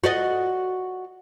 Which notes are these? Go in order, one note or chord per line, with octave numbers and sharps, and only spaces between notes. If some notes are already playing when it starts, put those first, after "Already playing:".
F#4 D5 D#5